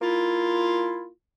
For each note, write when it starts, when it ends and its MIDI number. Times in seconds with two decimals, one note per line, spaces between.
0.02 1.08 58
0.02 1.08 64
0.02 1.08 65